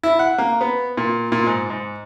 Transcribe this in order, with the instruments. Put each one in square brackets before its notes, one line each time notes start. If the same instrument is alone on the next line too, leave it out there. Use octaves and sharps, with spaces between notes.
[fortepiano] E4
F#5
A#3
B3
A#2
A#2
G#2
G#2